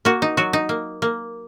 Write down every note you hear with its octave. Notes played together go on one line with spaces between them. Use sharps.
A#3 F#4
D#4
F#3 F#4
D#4
A#3
A#3